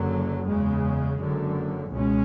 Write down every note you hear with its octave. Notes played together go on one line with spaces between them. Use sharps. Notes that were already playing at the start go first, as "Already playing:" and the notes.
Already playing: F#1 F#2 D3 F#3
E2 C#3 G#3
F#1 F#2 D3
C#2 B2 G#3 C#4